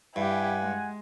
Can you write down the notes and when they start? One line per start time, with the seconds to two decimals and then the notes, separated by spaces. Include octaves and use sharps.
0.16 G2 E4 G4 F#5 G#5
0.62 G#3